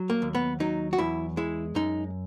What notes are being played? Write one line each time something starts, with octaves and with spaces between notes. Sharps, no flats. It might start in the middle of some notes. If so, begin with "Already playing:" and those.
Already playing: F#3
A#3
D#2
B3
F#3 D#4
F#4
E2 E4
G#3 E4
F#2 D#4